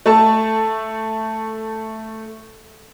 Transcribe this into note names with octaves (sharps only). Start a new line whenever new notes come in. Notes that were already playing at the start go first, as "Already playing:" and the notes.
A3 A4 A5